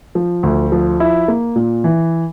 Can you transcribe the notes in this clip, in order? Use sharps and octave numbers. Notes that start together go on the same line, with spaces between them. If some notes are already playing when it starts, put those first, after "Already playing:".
F3
D2
F3
E4
A#3
A#2
E3